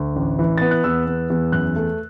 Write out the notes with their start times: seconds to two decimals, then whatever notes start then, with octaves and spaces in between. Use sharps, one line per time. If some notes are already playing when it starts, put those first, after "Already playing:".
Already playing: D2
0.16 A1
0.39 E3
0.58 B3 A6
0.71 F#6
0.84 E2 E6
1.07 B3
1.30 E2
1.52 F#2 F#6
1.76 A3